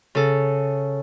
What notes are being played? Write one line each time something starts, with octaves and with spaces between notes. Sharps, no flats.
C#3 A4